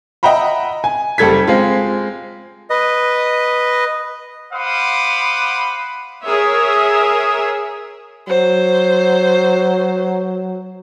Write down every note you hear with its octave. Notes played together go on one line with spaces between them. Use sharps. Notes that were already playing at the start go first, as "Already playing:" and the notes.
D#5 E5 F#5 G5 A#5 B5
G#5
F#1 G3 A4 G#6 B6
G#3 C4 F4
B4 D#5
C5 F5 F#5 B5 D6 D#6
G#4 A#4 C#5 E5
F#3 C5